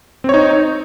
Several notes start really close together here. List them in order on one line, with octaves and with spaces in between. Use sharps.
C4 C#5 D#4